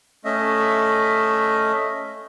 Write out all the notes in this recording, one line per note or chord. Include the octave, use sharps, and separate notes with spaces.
A3 C#4 D#5 E5